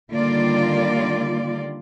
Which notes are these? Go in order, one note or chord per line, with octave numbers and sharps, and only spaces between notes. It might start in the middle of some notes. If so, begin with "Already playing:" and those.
D3 D#3 G3 A#3 F4 D5